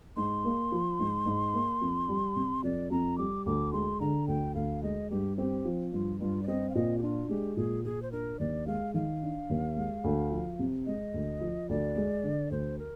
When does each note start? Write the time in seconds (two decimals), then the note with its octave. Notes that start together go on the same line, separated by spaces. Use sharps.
0.17 G#2 C6
0.44 A#3
0.72 F3
0.99 G#2
1.26 G#2
1.54 A#3
1.81 F2
2.08 G3
2.36 C3
2.63 F2 D5
2.91 F2 A#5
3.18 G3 D6
3.46 D2 D6
3.73 G#3 C6
4.00 D3 A#5
4.28 D2 G5
4.55 D2 F5
4.83 G#3 D#5
5.10 G2 G4
5.38 C4 G4
5.65 F3
5.92 G2 F4
6.20 G2 F4
6.43 D5
6.47 C4 D#5
6.70 F5
6.75 A#2 D#5
6.98 G4
7.03 D4 F4
7.29 G#3 G4
7.57 A#2 G#4
7.85 A#2 G#4
8.02 C5
8.12 D4 A#4
8.39 D#2 D5
8.67 G#3 F5
8.94 D#3 F5
9.22 D4
9.50 D#2
9.77 G#3
10.04 D2
10.31 F3
10.59 C3
10.86 G#3 D#5
11.14 D2
11.41 F3
11.69 D2 D5
11.96 G#3
12.23 D3
12.51 D2 C5
12.78 A#4